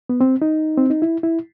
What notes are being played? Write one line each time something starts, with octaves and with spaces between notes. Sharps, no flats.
B3
C4
D#4
C4
D#4
E4
E4